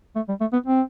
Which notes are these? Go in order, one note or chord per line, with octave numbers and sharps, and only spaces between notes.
A3
G3
A3
B3
C4